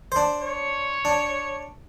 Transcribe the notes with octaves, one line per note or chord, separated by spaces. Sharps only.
D4 C5
C#5
D4